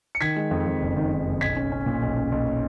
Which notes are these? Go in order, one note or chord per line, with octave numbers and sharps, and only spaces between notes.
C#7
D#3 G#6 B6
G#3
F2
F2
F#1
D#3
D#3
F#1
B1 G#6 B6
C#4
C#4
A#2
B1
C#4
B1